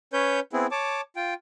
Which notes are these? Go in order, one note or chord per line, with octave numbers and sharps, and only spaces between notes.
C#4 B4 C#5 G6
B3 C4 E4 G#4
C#5 A5 D6
F4 G5